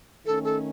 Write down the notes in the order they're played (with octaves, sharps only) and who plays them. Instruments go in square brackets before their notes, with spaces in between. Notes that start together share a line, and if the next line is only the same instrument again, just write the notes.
[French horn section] D#3 A3 C#4 [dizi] A4
[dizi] A4